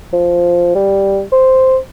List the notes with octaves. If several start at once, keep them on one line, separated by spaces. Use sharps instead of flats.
F3
G3
C5